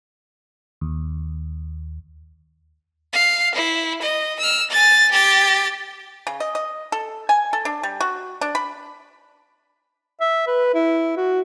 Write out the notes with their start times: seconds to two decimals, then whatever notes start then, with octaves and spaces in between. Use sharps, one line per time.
0.81 D#2
3.13 F5
3.55 E4
4.02 D#5
4.40 E6 F6
4.70 G#5 A6
5.11 G4 A6
6.27 C#3
6.40 D#5
6.55 D#5
6.92 A4
7.29 G#5
7.53 A4
7.65 D4
7.83 G3
8.01 F#4
8.41 D4
8.55 B5
10.20 E5
10.47 B4
10.74 E4
11.17 F#4